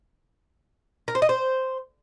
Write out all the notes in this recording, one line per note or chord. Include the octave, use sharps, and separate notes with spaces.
A#4
C5
D#5
C5